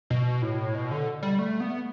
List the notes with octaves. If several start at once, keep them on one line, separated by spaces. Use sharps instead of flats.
B2
A2
B2
D3
G3
A3
B3